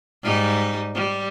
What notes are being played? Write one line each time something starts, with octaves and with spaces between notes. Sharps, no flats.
G#2 G3 D#4
G3